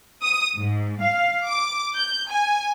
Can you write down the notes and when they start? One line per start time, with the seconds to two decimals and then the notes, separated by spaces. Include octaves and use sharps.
0.23 D#6
0.57 G#2
1.02 F5
1.47 D6
1.96 G6
2.30 G#5